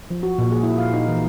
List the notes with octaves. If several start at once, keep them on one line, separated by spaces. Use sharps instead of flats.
F3
F#4
A#2
G#4
E4
F5
D#4
E3